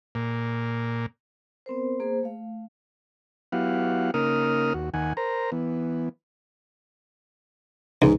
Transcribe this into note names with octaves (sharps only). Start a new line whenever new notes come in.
A#2
B3 C4 A#4 C5
A#3 G#4 C5
A3 F5
F#3 B3 E4 G4 F5 F#5
C#3 A#3 D#4 A#4 D#6 F6
D#2 F#4
D#2 D#3 F#5 G#5
A#4 C5 A#5
E3 B3
C#2 G#2